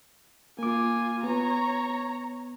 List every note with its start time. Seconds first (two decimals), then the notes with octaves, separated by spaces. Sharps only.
0.59 A#3 F4 G#5 D6
1.24 B3 C#5 A#5